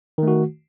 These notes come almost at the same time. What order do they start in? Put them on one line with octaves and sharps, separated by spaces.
D#3 A3 F#4